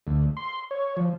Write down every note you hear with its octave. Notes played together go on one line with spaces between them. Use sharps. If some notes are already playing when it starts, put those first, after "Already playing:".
D2
C6
C#5
F3